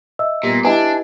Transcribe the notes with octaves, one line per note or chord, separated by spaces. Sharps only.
D#5 E5 E6
A#2 G3 B3
D4 E4 G4 B4 D#5 G#5